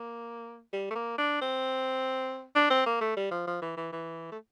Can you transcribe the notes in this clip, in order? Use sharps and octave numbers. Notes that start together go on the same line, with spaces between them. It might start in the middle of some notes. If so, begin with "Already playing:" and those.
Already playing: A#3
G3
A3
A#3
D4
C4
D4
C4
A#3
A3
G3
F3
F3
E3
E3
E3
A3